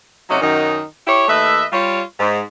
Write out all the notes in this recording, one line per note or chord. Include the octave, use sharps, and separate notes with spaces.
C3 F#3 A3 C#4 D#4 F#4
F#2 D#3 D#4
E4 G4 C#5
D#2 A3 B4 D#5 E5
G3 F4 C#5
G#2